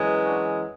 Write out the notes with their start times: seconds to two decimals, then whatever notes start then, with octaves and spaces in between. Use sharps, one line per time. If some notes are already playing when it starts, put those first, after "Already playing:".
Already playing: F#2 E3 G#3
0.25 D4 F#4